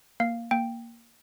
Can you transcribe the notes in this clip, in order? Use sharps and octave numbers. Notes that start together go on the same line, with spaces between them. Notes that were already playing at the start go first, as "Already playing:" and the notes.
A#3 F5
A#3 G5